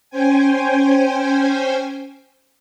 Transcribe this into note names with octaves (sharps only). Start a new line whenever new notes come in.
C#4 C5 G5 G#5